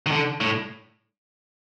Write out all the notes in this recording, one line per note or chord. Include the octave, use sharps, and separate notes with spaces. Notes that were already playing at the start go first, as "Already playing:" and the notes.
D#3
D3
A2